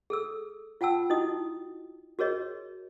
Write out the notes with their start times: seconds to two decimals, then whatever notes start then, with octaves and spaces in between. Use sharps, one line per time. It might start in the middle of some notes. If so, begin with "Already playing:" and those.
0.10 G#4 A4 E6
0.81 F4 F#5 G5 A5 E6
1.10 D#4 E4 F#4 D#5 D#6
2.19 F#4 G#4 A#4 C#5 D#5